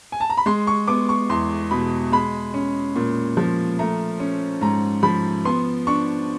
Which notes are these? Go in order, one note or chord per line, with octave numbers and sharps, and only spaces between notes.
G#5
A5
A#5
B5
G#3 C6
C#6
B3 D6
C#6
E2 C6
B2 B5
G#3 B5
C#4
A#2
F3
A3 A#5
C#4
G#2 A#5
F3 B5
B3 C6
D4 C#6